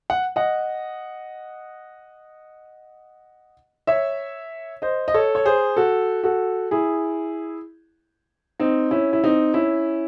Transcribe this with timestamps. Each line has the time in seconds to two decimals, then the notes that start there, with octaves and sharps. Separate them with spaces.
0.10 F#5
0.36 D#5 F#5
3.87 C#5 E5
4.82 C5 D#5
5.08 D#5
5.14 A4 C#5
5.35 C#5
5.45 G#4 C5
5.77 F#4 A4
6.23 F#4 A4
6.71 E4 G#4
8.60 C4 D#4
8.91 C#4 E4
9.13 E4
9.24 C4 D#4
9.54 C#4 E4